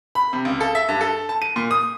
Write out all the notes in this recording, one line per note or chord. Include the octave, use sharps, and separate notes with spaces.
B5
C3
C#2
A4
E5
G2
A4
A5
D#7
A#2
D#6